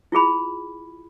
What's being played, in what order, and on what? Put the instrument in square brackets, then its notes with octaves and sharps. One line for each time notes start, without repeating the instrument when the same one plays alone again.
[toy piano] E4 F4 G#4 B5